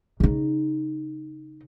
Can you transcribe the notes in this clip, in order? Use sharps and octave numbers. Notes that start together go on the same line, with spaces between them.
C#3 D#4